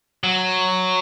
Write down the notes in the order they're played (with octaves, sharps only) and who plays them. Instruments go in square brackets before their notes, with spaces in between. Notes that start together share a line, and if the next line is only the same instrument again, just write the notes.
[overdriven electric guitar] F#3